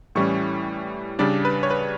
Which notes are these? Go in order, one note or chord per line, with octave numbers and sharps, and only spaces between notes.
A2 E3 G3 C#4 C#6
C#3 G3 D4 D5
B4
C#5
B4